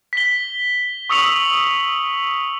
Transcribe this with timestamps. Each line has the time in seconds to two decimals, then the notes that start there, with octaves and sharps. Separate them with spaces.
0.13 B6 G7
1.10 C#6 D#6 E6 C#7 F7 F#7